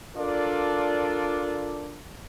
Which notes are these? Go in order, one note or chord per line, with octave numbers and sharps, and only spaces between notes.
D4 F4 A4 A#4 D5